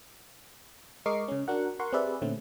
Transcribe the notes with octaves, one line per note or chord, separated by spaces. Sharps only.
G#3 A#4 D#5 C#6 D6 C7
C#3 C#4
D4 F#4 A#4 F#5
A#4 F#5 C6 C#6
C4 G4 G#4 B4 D5 E5
A#2 D3 A3 C4 C#4